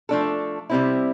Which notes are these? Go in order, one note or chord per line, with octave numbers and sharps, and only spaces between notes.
F3 A3 D4 A4
C3 G3 C4 E4